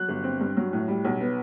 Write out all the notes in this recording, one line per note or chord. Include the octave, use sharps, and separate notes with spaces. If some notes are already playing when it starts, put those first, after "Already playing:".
Already playing: F#3 F#6
G1
C4
G2
F#3
A2
G3
B1
B3